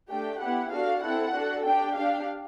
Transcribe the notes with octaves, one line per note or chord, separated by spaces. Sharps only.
A3 D4 G4 G5
B3 E4 G4 F#5
D4 F#4 A4 F5
C4 E4 A4 F#5
D4 F#4 A4
D4 G4 G5
D4 G4 F5